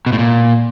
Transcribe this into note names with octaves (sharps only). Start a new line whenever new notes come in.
B2
A2
A#2